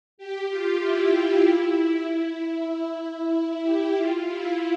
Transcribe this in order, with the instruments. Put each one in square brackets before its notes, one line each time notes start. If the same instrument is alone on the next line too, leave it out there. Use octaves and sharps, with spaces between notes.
[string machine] G4
F4
E4
E4
E4
G4
F4
E4